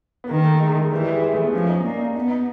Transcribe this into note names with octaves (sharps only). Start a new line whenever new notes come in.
B3
D#3 A#3
A3
G#3
G#3
E3 G3
G#3
G#3
A3
B3
F3 C#4
D#4
A#3 D4
D#4
B3 D#4
D#4